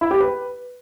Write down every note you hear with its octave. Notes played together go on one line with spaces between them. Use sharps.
E4
G4
B4